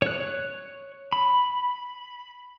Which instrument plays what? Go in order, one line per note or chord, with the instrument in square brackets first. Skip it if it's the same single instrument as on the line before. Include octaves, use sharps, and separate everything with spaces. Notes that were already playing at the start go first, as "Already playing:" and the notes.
[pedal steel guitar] C#5 F#6
B5